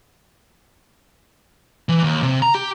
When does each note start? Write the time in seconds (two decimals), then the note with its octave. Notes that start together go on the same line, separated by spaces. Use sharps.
1.89 E3
2.04 D#2
2.23 C3
2.42 A#5
2.55 G4